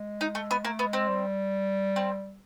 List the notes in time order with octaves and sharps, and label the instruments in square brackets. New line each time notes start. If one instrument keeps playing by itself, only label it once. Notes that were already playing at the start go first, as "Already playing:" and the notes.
Already playing: [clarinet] G#3
[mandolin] D#4
A3
B3
[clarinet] A3 [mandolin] A#3
[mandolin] B3
[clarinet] G#3
[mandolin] C4
[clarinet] G3
[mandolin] C4